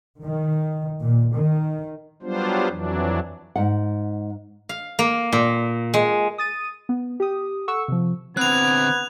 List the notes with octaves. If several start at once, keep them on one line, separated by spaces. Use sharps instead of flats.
D#3
A#2
D#3
F#3 G3 B3 D4 F4 C5
F2 E3 F#3 D4
G#2 F#5
F5
A#3
A#2
G#3
D#6 A6 D#7
B3
G4 D#6
A4 F#5 C#6 E6
C3 F3
D3 B3 C4 F#6 G#6 F7